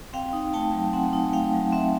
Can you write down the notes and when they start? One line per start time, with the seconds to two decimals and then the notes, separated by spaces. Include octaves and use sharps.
0.13 C4 F5 G5
0.33 D#4
0.53 A3 G5 A5
0.74 F#3
0.93 C4 F#5 G#5
1.13 D#4
1.33 A3 F5 G5
1.54 F#3
1.72 C4 E5 F#5